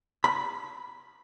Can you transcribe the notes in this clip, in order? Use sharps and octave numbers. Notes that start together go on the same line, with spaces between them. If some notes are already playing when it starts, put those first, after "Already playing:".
B5